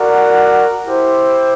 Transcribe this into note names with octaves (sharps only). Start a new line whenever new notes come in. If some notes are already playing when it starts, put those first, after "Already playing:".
Already playing: F#4 A#4 D5 F#5
E4 G4 C5